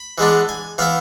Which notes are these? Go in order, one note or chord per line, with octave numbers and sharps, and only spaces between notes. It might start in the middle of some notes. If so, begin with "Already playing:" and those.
Already playing: B5
E3 G#3 B3 D4
G#5
E3 B3 E4 F5